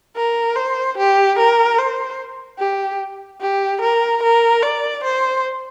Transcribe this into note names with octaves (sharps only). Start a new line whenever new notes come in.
A#4
C5
G4
A#4
C5
G4
G4
A#4
A#4
D5
C5